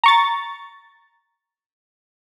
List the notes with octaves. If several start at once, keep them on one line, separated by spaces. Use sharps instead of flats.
A#5 C#6 A6